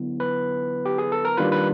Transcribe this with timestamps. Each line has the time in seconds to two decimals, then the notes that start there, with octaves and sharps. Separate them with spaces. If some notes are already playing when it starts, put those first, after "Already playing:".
Already playing: D3 F#3 B3 E4
0.20 B4
0.86 G4
0.98 G#4
1.12 A4
1.25 A#4
1.37 D#3 G3 A#3 D4 F4 B4
1.52 B4